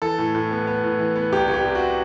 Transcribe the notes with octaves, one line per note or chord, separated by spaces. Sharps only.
E3 A4
A2
A2
B3
B3
A2
E3
B3
C2 G4
C2
G4
C3
F#4